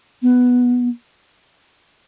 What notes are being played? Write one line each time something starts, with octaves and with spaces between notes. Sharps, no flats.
B3